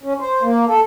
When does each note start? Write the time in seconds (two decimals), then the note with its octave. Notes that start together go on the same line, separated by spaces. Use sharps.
0.03 C#4
0.19 C5
0.43 A#3
0.67 A4